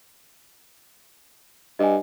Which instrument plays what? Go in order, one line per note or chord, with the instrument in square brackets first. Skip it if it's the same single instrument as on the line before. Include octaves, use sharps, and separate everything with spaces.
[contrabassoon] G2 [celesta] D#5 G#5